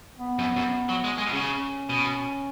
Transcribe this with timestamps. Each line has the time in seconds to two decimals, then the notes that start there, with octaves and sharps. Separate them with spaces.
0.19 B3
0.39 F#2
0.57 F#2
0.90 F#3
1.05 G#3
1.18 G#3
1.27 B2
1.33 C#3 C#4
1.90 B2